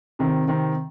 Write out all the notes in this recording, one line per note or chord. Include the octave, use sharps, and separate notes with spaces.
C3 D#3 C4
C3 D#3 C4